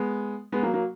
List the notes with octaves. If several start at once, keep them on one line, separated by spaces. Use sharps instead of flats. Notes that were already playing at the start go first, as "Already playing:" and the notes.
Already playing: G#3 B3
G#3 B3
F#3 A#3
F#3 A#3